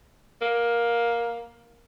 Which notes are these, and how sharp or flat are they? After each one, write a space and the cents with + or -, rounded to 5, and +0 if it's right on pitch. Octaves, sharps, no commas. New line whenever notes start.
A#3 +10